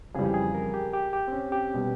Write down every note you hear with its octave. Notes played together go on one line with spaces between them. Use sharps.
F2 C#3 E3 G3 G#4
G4
G#4
A#4
G4
G4
G4
C4
C#4
G4
B2 G3